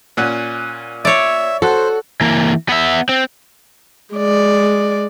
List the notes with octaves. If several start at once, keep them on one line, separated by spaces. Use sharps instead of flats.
A#2 C#4 F#5
C#5 D5 E5
F#4 A4 C5
E3 A#3
B3 E5
C4
G#3 D5